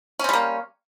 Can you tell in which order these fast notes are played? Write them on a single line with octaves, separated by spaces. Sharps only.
C#4 C4 G3 A#3